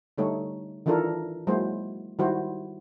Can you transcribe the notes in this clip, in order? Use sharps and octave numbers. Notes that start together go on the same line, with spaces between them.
D3 G3 A3 D#4 C#5
D#3 E3 D4 F4 A4 A#4
F#3 G#3 A#3 E4 F#4 C5
D#3 G3 E4 F#4 C5